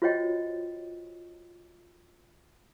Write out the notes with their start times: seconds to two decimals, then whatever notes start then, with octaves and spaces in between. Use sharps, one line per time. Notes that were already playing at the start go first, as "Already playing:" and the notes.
0.02 F4 F#4 C5 C#5 D#5 G5